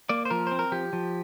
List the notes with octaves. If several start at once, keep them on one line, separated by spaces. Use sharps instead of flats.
A#3 D5
C5
F3 A#4
C4 C5
A#4
F3 G4
F3